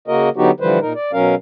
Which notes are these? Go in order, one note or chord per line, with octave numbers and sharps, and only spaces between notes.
C#3 A#3 F#4 A#4 D#5
D3 F#3 B3 D#4 F#4 G4
D3 E3 F3 G3 B4 C5
A#2 D#4 A#4
D5
B2 F#3 C#4 A#4 F5